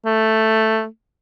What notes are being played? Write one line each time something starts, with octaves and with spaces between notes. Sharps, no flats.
A3